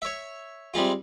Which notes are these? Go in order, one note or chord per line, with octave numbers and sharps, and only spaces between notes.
C#5 E5
C3 G3 G#3 F4